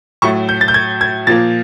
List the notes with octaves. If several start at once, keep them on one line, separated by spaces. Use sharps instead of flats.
A2 F#3 A3 C#6
G6
A6
G6
G#6
G#6
A#2 F3 A#3 A6